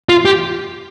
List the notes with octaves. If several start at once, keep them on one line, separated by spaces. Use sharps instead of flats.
F4
G4